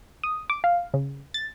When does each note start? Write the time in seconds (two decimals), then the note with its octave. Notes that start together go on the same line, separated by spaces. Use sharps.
0.24 D#6
0.50 D6
0.64 F5
0.94 C#3
1.34 A6